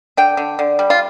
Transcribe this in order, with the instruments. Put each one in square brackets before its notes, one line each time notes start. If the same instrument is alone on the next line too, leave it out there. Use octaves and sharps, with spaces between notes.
[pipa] D3 G5
D3
D3
G3
F4